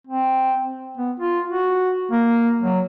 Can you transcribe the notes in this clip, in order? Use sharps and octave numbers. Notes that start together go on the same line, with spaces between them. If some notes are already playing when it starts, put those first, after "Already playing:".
C4
B3
F4
F#4
A#3
F#3